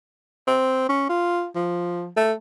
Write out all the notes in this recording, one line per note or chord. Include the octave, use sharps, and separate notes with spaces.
C4
C#4
F4
F3
A3